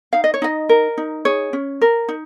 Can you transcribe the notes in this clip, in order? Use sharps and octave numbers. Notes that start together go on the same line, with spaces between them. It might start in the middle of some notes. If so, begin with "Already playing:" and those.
D#4 F5
D#5
C#5
D#4 D#5
A#4
D#4
G#4 C#5
C#4
A#4
D#4